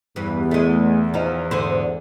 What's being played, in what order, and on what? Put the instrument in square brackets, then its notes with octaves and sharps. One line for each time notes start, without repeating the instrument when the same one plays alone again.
[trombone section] E2 [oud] G2 E3
[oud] G#3 A3
F3 D#4
G#2 D3 C5